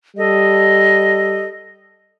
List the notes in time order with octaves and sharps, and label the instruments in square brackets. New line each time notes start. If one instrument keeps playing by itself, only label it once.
[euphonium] G3 [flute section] A4 D#5